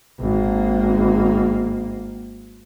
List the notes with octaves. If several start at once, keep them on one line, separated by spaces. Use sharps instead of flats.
G#1 A#3